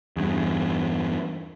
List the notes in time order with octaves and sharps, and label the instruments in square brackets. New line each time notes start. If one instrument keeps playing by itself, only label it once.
[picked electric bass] E2 G2